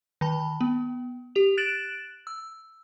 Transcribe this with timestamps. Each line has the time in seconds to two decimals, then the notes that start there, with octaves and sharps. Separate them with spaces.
0.21 D#3 A5 B5
0.61 B3
1.35 G4 F7
1.57 F#6 A6 D7 E7 F#7
2.27 E6